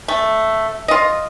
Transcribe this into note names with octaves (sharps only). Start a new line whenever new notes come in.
A3
F4 D#5